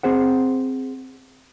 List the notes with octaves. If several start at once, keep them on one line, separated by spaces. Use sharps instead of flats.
C4 G#4 C5 F#5